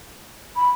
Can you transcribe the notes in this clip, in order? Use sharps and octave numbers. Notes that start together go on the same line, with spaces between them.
B5